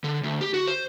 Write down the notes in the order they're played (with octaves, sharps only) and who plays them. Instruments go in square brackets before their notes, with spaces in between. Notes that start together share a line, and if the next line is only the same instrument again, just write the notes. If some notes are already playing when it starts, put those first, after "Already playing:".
[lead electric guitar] D3
D2
G4
F#4
C5